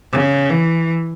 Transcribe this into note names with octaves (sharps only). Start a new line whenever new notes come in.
C#3
E3